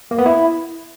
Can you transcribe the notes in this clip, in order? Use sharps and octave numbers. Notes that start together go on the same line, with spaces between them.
A#3
B3
E4